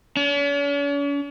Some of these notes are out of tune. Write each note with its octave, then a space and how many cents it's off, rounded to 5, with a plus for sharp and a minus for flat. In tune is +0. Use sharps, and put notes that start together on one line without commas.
C#4 +45